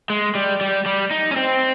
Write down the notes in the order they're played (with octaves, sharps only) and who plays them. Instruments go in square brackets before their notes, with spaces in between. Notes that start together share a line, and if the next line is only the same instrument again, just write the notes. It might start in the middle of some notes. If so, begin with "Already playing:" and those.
[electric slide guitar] G#3
G3
G3
G3
D#4
C#4
C4